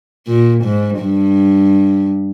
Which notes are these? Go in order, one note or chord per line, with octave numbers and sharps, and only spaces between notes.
A#2
G#2
G2